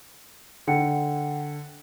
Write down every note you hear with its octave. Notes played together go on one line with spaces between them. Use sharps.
D3 F#5 G5 C#7